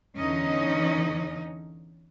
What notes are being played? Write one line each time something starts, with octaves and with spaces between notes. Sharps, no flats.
E2 D3 E3 C#4 D#4 D#5